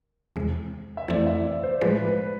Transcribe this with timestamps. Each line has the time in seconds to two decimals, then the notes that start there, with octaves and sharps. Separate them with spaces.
0.36 E2 C3 G#3
0.97 E5
1.08 F2 E3 A3 C4 E4 D5
1.27 E5
1.46 D5
1.63 C5
1.81 A2 F3 G#3 B4
2.06 B4